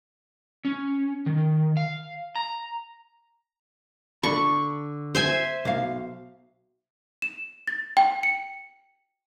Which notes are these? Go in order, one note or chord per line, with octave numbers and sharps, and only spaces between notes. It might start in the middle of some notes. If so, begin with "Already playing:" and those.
C#4
D#3
F5
A#5
D3 A5 B5 C#6
C5 E5 G#5
B1 F5
E7
A6
G5
C#7